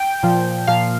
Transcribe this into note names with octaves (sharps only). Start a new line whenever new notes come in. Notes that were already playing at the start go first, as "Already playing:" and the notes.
Already playing: G5
A#2 F3
A#2 F3 F5